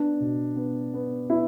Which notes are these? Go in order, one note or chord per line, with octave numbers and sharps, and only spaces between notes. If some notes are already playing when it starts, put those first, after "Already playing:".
Already playing: B3 D4
B2
B3
B3
B3 E4